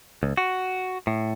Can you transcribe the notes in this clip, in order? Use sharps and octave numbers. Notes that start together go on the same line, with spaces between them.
C#2
F#4
A2